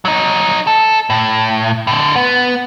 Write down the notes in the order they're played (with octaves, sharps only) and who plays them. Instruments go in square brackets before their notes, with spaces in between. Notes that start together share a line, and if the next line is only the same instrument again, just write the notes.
[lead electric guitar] F#3 D#4
A4
A2
A2 D3
B3